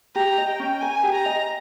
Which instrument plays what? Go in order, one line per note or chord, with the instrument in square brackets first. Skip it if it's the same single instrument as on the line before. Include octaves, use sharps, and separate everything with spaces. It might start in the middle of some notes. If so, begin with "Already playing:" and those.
[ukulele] G4 [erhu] A#5
[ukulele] D#5
[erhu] G5
[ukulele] C#4
[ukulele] A#4 [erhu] G#5
[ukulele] G4
[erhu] A#5
[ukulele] D#5